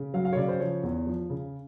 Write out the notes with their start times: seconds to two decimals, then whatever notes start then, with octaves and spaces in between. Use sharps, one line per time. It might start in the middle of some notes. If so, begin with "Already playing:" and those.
Already playing: C#3
0.14 F#3 F5
0.25 F5
0.33 C#5
0.37 C#3 D5
0.48 C5
0.60 F3 C#5
0.83 E2
1.07 F3
1.30 C#3